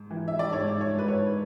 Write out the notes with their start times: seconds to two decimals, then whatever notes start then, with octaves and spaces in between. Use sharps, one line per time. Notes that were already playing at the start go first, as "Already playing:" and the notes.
Already playing: G#2
0.11 E3
0.28 E5
0.39 D5
0.52 G#2 C#5
0.81 C#5
0.95 G#2 B4
1.08 C#5